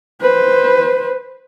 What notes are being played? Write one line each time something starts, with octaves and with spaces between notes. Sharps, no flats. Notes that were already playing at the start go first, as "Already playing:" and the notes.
B4 C5